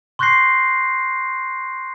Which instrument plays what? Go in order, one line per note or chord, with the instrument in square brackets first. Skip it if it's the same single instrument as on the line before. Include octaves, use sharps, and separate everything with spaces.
[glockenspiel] C6 C#6 F#6 G6 A#6 C7